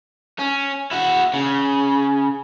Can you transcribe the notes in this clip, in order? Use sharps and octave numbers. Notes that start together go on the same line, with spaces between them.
C#4
E4 F#4
C#3